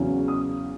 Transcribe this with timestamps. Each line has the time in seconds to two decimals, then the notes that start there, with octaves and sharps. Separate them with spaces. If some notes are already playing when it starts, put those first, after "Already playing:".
Already playing: E2 C#3 F#3 C#4
0.28 D#6